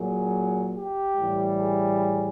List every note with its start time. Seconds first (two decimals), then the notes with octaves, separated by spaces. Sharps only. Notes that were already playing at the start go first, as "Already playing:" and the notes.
Already playing: A#2 F#3 G#4
0.75 G4
1.17 A2 E3 G3
1.58 G#4